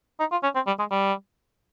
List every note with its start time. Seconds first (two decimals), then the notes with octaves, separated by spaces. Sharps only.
0.20 D#4
0.32 F4
0.43 C#4
0.55 C4
0.67 G3
0.79 G#3
0.91 G3